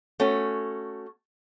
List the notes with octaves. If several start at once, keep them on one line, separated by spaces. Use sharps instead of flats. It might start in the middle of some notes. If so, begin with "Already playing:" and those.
A3 C#4 F#4